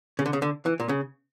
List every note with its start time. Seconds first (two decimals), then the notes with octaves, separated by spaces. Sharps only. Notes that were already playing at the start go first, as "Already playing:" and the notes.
0.19 C#3
0.26 D3
0.33 C#3
0.42 D3
0.66 E3
0.80 A#2
0.89 C#3